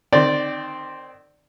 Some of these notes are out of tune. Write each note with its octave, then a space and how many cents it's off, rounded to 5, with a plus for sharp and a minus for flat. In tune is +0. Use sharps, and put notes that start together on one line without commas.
D#3 -20 C4 +0 D5 +0